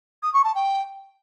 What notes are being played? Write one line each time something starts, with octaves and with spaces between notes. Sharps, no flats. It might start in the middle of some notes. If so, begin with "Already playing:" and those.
D#6
C#6
A5
G5